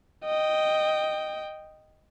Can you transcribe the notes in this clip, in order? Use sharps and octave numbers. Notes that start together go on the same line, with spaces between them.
D#5 G5